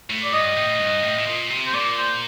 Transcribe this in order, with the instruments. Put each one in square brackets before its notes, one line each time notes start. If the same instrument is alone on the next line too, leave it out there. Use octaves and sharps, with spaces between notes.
[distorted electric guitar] A2
[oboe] D5
[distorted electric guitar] G2 [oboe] D#5
[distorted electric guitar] A2
G2
A2
A2
A#2
C3
[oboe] C5
[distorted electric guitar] A#2 [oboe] D5
[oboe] C5